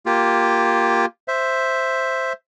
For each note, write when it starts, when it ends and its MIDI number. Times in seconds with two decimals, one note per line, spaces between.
0.06 1.06 58
0.06 1.06 65
0.06 1.06 67
1.28 2.33 72
1.28 2.33 76